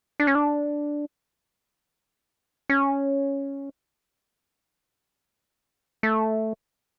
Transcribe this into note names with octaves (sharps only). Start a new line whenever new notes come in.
D4
C#4
D4
C#4
A3